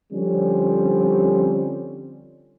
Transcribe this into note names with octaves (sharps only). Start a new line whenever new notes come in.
D3 F3 G3 C4 C#4